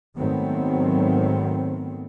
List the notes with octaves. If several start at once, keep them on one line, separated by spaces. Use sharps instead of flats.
G#2 D#3 F#3 A3 B3 C4